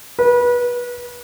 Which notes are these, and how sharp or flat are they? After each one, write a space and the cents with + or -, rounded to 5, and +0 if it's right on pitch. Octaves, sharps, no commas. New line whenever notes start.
B4 -25